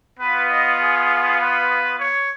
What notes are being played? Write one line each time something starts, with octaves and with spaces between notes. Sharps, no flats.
B3 F4 B4
D#5
G#4
B4
C#5